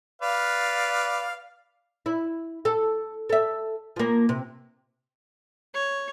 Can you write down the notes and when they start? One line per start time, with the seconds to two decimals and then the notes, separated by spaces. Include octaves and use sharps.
0.22 B4 D5 F5
2.06 E4
2.65 A4
3.29 A4 E5
3.96 F3 A#3
4.29 C3
5.74 C#5